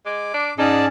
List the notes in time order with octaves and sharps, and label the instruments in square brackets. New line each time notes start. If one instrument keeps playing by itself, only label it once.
[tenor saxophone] G#3 [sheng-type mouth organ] D6
[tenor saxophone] D4
[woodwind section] G#2 C#4 [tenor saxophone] D#4 [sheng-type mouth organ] G#4 D5 A5